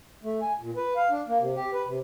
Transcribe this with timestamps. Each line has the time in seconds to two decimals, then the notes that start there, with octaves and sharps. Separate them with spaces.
0.23 A3
0.42 G#5
0.60 A#2
0.76 B4
0.96 F5
1.10 D4
1.28 A#3
1.40 C3
1.56 G4
1.73 B4
1.87 C3